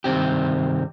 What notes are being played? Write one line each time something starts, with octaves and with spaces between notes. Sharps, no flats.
G2 C3 D#3 C4 G4